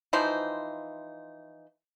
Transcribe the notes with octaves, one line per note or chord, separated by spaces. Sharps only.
E3 F3 D#4 C5